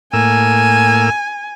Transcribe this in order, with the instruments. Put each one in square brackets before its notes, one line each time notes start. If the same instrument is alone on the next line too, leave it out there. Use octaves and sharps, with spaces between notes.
[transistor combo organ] A2 A#3 E6 [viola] G#5